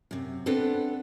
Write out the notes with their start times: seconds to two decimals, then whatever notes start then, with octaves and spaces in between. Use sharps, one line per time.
0.11 F#2 C3
0.46 B3 C4 D4 A4 B4